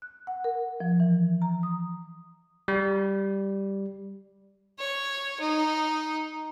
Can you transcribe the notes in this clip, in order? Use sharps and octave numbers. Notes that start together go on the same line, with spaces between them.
F#6
F#5
A#4
F3
E3
A#5
D#6
G3
C#5
D#4